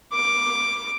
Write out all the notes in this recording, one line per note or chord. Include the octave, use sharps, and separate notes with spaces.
D6